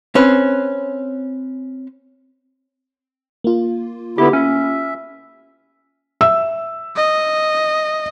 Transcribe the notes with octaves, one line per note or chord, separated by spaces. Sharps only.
C4 C#4 B4
A#3 F4
D3 B3 E4 G4
C#4 E5
E5 E6
D#5